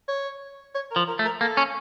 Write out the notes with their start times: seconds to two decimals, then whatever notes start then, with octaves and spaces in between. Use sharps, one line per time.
0.08 C#5
0.75 C#5
0.91 A#4
0.96 F3
1.08 A#4
1.19 A3
1.25 A#4
1.41 A#3 A4
1.57 C#4